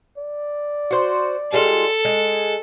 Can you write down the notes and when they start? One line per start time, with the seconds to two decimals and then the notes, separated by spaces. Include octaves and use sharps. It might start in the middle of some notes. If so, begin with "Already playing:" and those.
0.17 D5
0.91 F#4 C5
1.52 G3 G#3 F4 A4
2.05 G#3